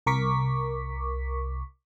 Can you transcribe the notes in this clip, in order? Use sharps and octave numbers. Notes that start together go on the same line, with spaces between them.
C2 A#4 C#6 D6 B6